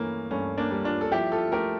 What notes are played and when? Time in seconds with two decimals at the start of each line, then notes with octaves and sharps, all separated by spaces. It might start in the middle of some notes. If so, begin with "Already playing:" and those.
Already playing: G2 E3 A3 A#3 C#4
0.31 G2 A3 C#4
0.58 A#3 D4
0.71 G3
0.85 D4 F4
1.01 A4
1.12 F3 E4 G4
1.32 F4 A4
1.52 A3 G4 A#4